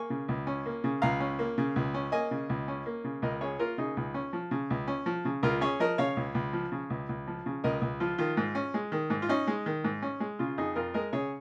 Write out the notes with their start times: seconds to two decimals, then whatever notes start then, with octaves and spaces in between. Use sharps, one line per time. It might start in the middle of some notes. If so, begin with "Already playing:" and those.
Already playing: A#3 G#5 C#6
0.10 C#3
0.28 C#2
0.47 C#4
0.66 A#3
0.84 C#3
1.02 C#2 F5 A#5
1.20 C#4
1.39 A#3
1.58 C#3
1.76 C#2
1.94 C#4
2.12 A#3 D#5 G#5
2.31 C#3
2.49 C#2
2.68 C#4
2.86 A#3
3.04 C#3
3.22 C#2 A#4 D#5
3.41 C#4 G#4 C#5
3.59 A#3 F4 A#4
3.78 C#3 D#4 G#4
3.97 C#2
4.14 C#4
4.33 F3
4.51 C#3
4.70 C#2
4.88 C#4
5.06 F3
5.25 C#3
5.43 C#2 F4 A#4
5.61 C#4 G#4 C#5
5.80 F3 A#4 D#5
5.98 C#3 C#5 F5
6.17 C#2
6.35 C#2
6.53 F3
6.72 C#3
6.90 C#2
7.09 C#2
7.27 F3
7.46 C#3
7.64 C#2 A#4 D#5
7.82 C#2
8.00 F3 F4
8.18 D#3 F4
8.37 G#2
8.55 C#4
8.74 G#3
8.92 D#3
9.10 G#2
9.22 F4
9.29 C#4 D#4
9.47 G#3
9.66 D#3
9.84 G#2
10.02 C#4
10.20 G#3
10.39 C#3 F4
10.58 F2 D#4 G#4
10.75 F2 F4 A#4
10.94 G#3 A#4 D#5
11.13 C#3 G#4 C#5